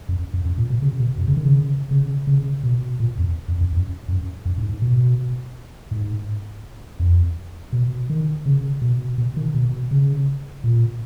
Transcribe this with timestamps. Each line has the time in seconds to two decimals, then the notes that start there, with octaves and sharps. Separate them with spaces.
0.09 F#2
0.33 F#2
0.45 F#2
0.58 A#2
0.70 B2
0.82 C#3
1.00 B2
1.18 F#2
1.28 C#3
1.37 D#3
1.45 C#3
1.91 C#3
2.27 C#3
2.63 B2
3.00 A#2
3.18 F2
3.48 F2
3.61 F2
3.73 F#2
4.08 F#2
4.45 F#2
4.58 G#2
4.69 G#2
4.82 B2
5.91 G#2
7.00 F2
7.73 B2
8.10 D#3
8.46 C#3
8.82 B2
9.18 B2
9.37 D#3
9.54 B2
9.91 C#3
10.64 A#2